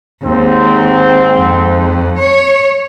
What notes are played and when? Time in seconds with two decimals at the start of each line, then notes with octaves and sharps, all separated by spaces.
0.23 D#2 G#2 C4
1.35 F2
2.18 C#5